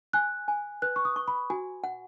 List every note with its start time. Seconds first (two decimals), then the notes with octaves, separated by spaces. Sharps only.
0.13 G#5 F#6
0.48 G#5
0.82 B4 F#6
0.96 C#6
1.05 D#6
1.16 C#6
1.28 B5
1.50 F#4 G#5
1.84 F#5